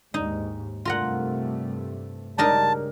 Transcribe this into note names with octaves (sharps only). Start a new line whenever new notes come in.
D#2 G#2 D#4
G2 C3 A3 F4 A#4 F#5
C#3 G3 G#3 D4 D#4 A#4 A5